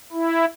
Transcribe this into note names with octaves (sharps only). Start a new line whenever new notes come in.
E4